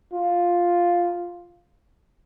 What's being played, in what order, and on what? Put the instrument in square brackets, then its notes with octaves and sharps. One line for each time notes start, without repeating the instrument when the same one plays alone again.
[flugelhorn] F4